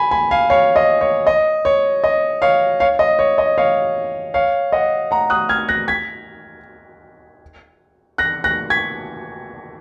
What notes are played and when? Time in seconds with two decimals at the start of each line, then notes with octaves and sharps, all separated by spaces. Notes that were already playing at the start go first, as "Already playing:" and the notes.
Already playing: G#5 B5
0.11 G#5 B5
0.31 F5 G#5
0.50 C#5 F5
0.76 D#5
1.01 C#5
1.27 D#5
1.65 C#5
2.04 D#5
2.42 C#5 F5
2.80 C#5 F5
2.99 D#5
3.19 C#5
3.38 D#5
3.58 C#5 F5
4.34 C#5 F5
4.72 D#5 F#5
5.11 F#5 A#5
5.30 D#6 F#6
5.49 F6 G#6
5.69 F#6 A#6
5.88 G#6 B6
8.18 F#6 A#6
8.44 F#6 A#6
8.70 G#6 B6